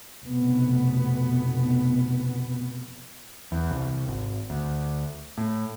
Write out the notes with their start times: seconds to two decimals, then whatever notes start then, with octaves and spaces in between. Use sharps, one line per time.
0.24 F1 B2 B3
3.52 E2
3.71 C2
4.08 G#1
4.50 D2
5.38 A2